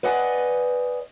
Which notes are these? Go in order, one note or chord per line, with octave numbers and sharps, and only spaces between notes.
B4 D5 D#5 F#5 G#5